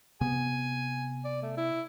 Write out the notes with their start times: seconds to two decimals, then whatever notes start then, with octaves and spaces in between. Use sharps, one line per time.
0.21 C3 B3 G#5
1.25 D5
1.42 A3
1.57 E4